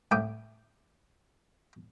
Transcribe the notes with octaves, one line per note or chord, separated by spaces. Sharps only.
C2 A2 G5 D6 D#6